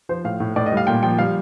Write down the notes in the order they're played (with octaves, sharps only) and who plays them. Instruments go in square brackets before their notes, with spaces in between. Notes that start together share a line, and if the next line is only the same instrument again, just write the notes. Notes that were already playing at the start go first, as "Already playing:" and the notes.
[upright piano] F3 C5
A2 F5
A2
A2 D5
D#5
G3
F5
A#2 G5
F3 G5
G3 F5